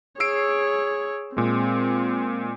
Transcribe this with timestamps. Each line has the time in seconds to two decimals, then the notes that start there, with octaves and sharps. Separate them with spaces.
0.20 G#4 C#5 E6 C7 D7
1.37 A#2 G#3 C4